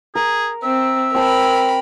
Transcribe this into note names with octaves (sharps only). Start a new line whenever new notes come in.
G#4 A#4
C4 E5
C4 A#4 A5 B5